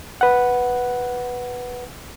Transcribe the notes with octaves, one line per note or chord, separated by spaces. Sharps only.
B4 F#5